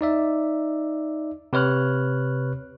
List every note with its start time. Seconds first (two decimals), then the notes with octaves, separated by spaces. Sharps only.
0.01 D#4 D5 E5
1.53 C3 B4 C#5 F6 F#6